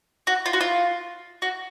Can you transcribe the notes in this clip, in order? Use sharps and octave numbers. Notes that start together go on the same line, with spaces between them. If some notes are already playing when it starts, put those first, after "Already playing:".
F#4
F4
F#4
F4
F#4